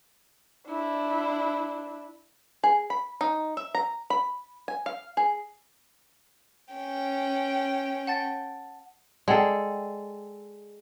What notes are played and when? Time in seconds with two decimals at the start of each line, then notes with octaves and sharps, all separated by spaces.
0.67 D4 E4
2.64 G#4
2.90 B5
3.21 D#4
3.57 E5
3.75 A#5
4.10 B5
4.68 G#5
4.86 F5
5.17 G#4
6.74 C#4 G5
8.07 F#5 A5 A6
9.28 G#3 A4 D5 F#5 G5